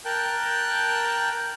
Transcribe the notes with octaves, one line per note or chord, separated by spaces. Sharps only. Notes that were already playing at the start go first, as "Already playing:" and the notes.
A#4 G5 A5 F#6 G6